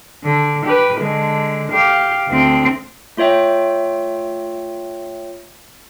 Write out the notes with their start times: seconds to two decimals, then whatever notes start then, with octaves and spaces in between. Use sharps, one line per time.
0.24 D3
0.66 G4 B4
0.98 D3 G#3
1.72 G4 F5
2.29 D2 C4
3.17 A3 F4 C#5 E5 G5